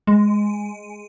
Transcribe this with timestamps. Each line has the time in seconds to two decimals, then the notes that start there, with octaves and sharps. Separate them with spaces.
0.07 G#3